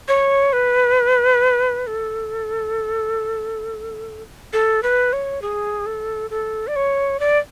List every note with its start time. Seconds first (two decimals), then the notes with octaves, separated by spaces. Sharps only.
0.08 C#5
0.53 B4
1.87 A4
4.53 A4
4.83 B4
5.13 C#5
5.42 G#4
5.86 A4
6.30 A4
6.67 D5
6.76 C#5
7.20 D5